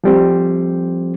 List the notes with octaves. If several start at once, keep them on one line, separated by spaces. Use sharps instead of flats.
F3 G3 C4